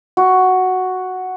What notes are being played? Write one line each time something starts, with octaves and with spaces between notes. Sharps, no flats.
F#4